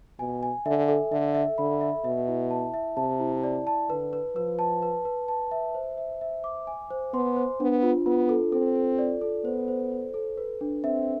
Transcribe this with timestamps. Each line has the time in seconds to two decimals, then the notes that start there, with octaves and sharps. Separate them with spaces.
0.19 B2 G#5
0.43 G#5
0.66 D3 E5
0.88 A4
1.12 D3 E5
1.35 E5
1.58 D3 B5
1.81 E5
2.04 B2 E5
2.28 E4
2.51 A5
2.74 E5
2.97 C3 A5
3.20 E4
3.43 D5
3.67 A5
3.89 D3 B4
4.13 B4
4.36 F3 B4
4.59 A5
4.82 B4
5.05 B4
5.28 A5
5.51 E5
5.75 C5
5.97 E5
6.21 E5
6.44 D6
6.67 G#5
6.91 C5
7.13 B3 C6
7.36 C5
7.60 B3 D4
7.83 F4
8.06 B3 F4
8.29 A4
8.52 C4 A4
8.76 A4
8.98 D5
9.21 A4
9.44 B3 C5
9.68 C5
9.91 C5
10.14 A4
10.38 B4
10.61 D4
10.83 C4 E5